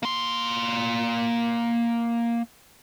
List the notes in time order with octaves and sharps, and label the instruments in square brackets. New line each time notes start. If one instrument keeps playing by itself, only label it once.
[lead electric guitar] A#3 C6